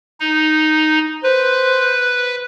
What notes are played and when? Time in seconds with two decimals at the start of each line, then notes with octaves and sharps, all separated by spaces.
0.20 D#4
1.24 B4 C5